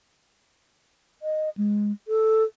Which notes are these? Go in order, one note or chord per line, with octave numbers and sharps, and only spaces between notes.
D#5
G#3
A4